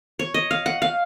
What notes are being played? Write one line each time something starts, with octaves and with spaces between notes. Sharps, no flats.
C#5
D#5
F5
F#5
F5